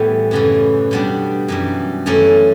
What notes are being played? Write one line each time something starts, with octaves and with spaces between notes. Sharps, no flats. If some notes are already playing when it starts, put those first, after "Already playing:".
Already playing: A2 E3 G3 A3 B3
F#2 C#3 E3 A3
B2 G3 B3 D4
F#2 E3 G3
F#2 E3 A3 C#4